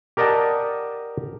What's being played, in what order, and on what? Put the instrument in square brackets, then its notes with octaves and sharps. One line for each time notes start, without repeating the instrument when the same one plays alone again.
[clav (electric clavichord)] G4 A#4 D5 D#5 F#5 A5